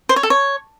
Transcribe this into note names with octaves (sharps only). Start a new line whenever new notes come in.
C5
C#5
A4
C#5